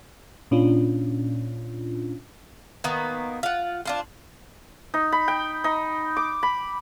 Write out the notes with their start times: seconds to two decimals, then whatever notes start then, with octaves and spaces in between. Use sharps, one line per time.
0.51 A#2 C#4 D4 F4
2.84 D#3 A#3 B3
3.43 F4 F#5
3.86 D4 F4 C5
4.94 D#4
5.12 B5
5.28 G5
5.64 D#4
6.17 D6
6.43 B5